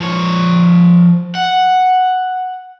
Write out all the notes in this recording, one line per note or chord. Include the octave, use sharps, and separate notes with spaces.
F3 C#5
F#5